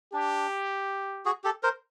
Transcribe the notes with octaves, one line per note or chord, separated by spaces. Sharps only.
D4 G4
F#4 G#4
G4 A4
A#4 C5